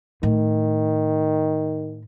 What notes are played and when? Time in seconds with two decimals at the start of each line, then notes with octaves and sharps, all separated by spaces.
0.23 A2 D#3